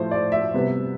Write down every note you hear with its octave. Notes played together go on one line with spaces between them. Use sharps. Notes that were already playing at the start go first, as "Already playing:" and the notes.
Already playing: A2 F3 A3 C5
D5
E5
C3 G3 B3